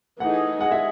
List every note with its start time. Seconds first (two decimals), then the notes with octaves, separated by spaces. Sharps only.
0.19 E3 A3 D#4 G#4 F#5
0.61 G#3 G#4 F#5
0.72 E5